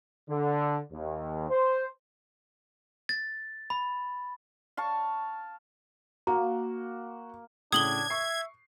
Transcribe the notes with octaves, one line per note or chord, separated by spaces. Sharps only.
D3
D#2
C5
A6
B5
F5 A5 C#6
A#3 F#4 A#5
A2 C#3 D4 D#6 G#6 F#7 G7
E5 C#6 C7